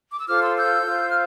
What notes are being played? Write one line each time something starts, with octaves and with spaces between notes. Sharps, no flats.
D6
E6
F4 A4 C5 D6 F6
C6 E6
E6 G6
F4 C5
F6